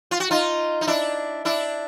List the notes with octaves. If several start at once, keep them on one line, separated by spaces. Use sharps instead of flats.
F4
F#4
D#4 F4
D#4
D4 E4
D4 E4